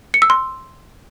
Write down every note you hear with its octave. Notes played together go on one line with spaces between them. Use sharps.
C#7
E6
C6